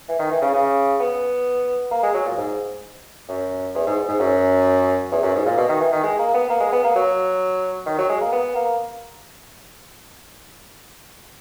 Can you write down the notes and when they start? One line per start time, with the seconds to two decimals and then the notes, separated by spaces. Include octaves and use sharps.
0.09 E3
0.19 D#3
0.30 E3
0.42 C#3
0.54 C#3
1.00 B3
1.91 A#3
2.03 G#3
2.14 F#3
2.25 A#2
2.37 G#2
3.29 F#2
3.75 E2
3.86 G#2
4.09 G#2
4.20 F#2
5.11 E2
5.23 F#2
5.35 G#2
5.46 A#2
5.57 B2
5.69 D#3
5.80 E3
5.92 D#3
6.03 G#3
6.18 A#3
6.34 B3
6.50 A#3
6.60 G#3
6.72 B3
6.84 A#3
6.95 F#3
7.86 D#3
7.98 F#3
8.09 G#3
8.21 A#3
8.32 B3
8.55 A#3